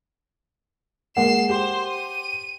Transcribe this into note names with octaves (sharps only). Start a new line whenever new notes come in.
G#3 A#3 F#5 C7 E7
G4 C5
D#7